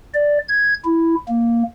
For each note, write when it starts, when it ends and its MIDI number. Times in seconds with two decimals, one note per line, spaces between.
0.14 0.38 74
0.49 0.74 92
0.85 1.15 64
1.29 1.63 58